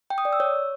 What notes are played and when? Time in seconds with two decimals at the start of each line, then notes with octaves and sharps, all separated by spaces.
0.10 G5
0.18 D#6
0.25 D5
0.33 E6
0.40 C#5